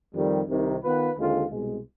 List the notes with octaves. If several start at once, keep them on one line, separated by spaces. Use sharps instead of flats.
F2 D#3 G3
C2 C3 D#3
D#3 B3 F4 B4
D#2 D3 G#3 C4 F4
C2 B2 G#3